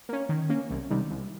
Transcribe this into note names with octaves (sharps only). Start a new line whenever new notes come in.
A#3 C#4
D#3
A#3 C#4
C2
C3 D#3 G3
C2